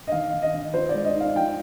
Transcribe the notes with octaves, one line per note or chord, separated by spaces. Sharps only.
D#5
D#3 F5
D#3
D#5
D#3
F3 C5
G#3 D5
D#5
D#4
F5
F3 G5